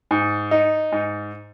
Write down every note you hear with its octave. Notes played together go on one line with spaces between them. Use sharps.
G#2
D#4
G#2